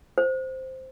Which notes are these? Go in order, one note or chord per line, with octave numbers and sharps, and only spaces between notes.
C5